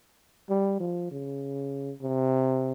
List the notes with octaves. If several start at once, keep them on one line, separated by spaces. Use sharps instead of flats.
G3
F3
C#3
C3